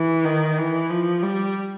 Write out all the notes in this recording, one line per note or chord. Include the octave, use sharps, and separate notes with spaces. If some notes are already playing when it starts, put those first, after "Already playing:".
Already playing: E3
D#3
E3
F3
G3